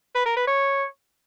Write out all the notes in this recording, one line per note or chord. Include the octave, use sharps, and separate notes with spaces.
B4
A#4
B4
C#5